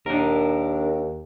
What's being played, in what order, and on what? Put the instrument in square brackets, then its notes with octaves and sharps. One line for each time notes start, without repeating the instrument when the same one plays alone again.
[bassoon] D#2 [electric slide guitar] D4 A#4